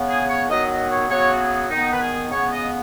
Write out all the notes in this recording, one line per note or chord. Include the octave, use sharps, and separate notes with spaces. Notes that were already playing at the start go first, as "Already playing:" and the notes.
Already playing: C#3 B3
G#4
C#5
D#3 F#3 B3 D#5
D#5
C#5
C#3 F#3 B3 C#5
F#4
G#4
D#3 B3 D#4
B4
G#4
C#3 B3 C#5
D#5